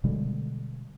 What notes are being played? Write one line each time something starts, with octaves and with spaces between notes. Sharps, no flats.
B2 D3 G3 G#3